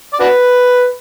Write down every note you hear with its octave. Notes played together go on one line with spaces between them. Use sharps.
D5
D4 F#4 B4